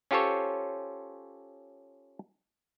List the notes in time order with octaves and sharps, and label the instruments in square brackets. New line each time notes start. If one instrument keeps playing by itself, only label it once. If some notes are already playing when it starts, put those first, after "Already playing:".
[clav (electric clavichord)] C#4 F4 G4 A4 C5 C#5